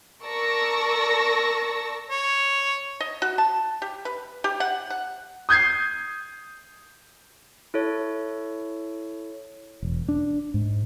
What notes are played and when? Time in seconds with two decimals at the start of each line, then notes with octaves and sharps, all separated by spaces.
0.24 A#4 D5 A5 C#6 E6 A#6
2.10 C#5
3.00 D#5
3.22 F#4
3.38 A5
3.82 G4
4.05 B4
4.44 G4
4.60 F#5
4.90 F#5
5.49 D#6 G6 G#6 C7
7.74 E4 A4 C#5
9.82 E1
10.09 D4
10.54 G#2